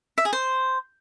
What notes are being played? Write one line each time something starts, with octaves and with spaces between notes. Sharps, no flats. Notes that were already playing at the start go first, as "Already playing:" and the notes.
E5
G#4
C5